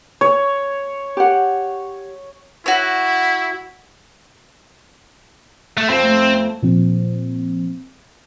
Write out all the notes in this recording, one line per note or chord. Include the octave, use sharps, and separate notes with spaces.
C#5
G4 F#5
E4 F#4 C#5
A3
F2 C4
A3
A#2 F3 C4